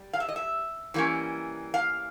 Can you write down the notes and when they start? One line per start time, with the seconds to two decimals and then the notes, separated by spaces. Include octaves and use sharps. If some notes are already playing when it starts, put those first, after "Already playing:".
Already playing: G3
0.13 F5
0.20 E5
0.29 D#5
0.36 E5
0.94 E3 G3 A#3 C#4
1.74 F5